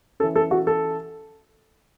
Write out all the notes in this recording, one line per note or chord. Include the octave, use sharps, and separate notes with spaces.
E3 C#4 A4
A4
F#4
A4